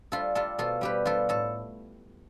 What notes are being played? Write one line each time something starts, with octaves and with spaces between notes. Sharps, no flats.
G3 F4 A4
G3 F4 A4
B2 F4 A4
G3 G4 B4
G3 F4 A4
A2 A4